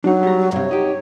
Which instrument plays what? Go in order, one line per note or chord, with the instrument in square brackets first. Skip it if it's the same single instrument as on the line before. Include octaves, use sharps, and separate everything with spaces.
[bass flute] F#3 [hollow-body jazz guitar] D4 D#4
[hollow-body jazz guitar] G3 A#5
[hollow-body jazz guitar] G2 C3 [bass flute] C#5
[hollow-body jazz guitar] D#4 G4